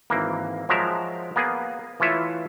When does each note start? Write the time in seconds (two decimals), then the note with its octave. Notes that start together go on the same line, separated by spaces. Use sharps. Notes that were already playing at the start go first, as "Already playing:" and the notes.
0.10 G#1 E3 A#3
0.69 F3 F#3 G#3 A#4 E5 A#5
1.36 A#3 B3 G#4
2.00 E3 A3 E4 F4 C#5 E5